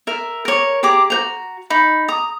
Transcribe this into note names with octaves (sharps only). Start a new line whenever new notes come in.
A#4 E5
A#4 C#5
G4 G#4 A#5 D6
F#4 C5 A#5
D#4 B5
A#5 D#6